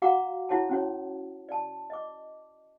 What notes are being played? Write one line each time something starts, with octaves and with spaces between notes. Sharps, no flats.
F#4 F5 F#5 A#5 D6
E4 F#4 C#5 F#5 A5
C#4 F#4 C#5
D5 A5
D#5 D6